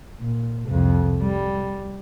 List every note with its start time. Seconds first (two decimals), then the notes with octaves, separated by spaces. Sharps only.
0.21 A#2
0.68 C2 F2
1.22 G3